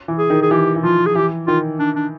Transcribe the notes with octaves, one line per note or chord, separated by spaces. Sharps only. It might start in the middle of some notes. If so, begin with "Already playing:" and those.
E3
G#4
D#3
G#4
E3 G4
E3
F3 F4
G#4
E3 G4
D#3 F4
D4
D4